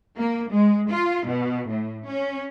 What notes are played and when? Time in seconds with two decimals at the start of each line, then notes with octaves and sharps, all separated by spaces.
0.17 A#3
0.50 G#3
0.90 F4
1.26 B2
1.69 A2
2.06 C#4